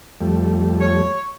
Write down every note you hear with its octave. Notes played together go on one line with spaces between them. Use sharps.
F2 G3 A3
C#5